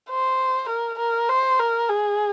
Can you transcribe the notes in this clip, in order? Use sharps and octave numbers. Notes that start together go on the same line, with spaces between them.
C5
A#4
A#4
C5
A#4
G#4